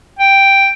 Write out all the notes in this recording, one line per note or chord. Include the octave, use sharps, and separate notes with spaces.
G5